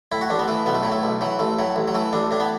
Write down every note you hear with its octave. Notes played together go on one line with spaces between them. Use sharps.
A2 E4
F#4
A1 D4
B3
E3 A3
B1 B3
A3
A2 F#3
A3
B1
E3 F#3
A1 A3
A2 F#3
A1
F#3
E3 A3
A1 D4
A2 D4
B3